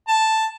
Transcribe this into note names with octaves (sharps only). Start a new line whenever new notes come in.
A5